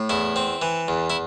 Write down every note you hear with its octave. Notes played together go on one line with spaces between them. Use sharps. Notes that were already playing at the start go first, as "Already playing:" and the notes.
Already playing: A2
E2 E4
C4
E3
E2
E4